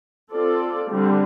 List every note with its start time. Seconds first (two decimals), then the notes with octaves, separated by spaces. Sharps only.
0.32 C4 F4 A4 D5
0.91 D3 G3 C4